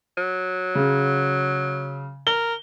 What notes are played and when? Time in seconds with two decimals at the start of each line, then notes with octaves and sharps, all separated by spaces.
0.17 F#3
0.75 C#3
2.27 A#4 G7